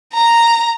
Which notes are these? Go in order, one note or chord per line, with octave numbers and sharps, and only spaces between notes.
A#5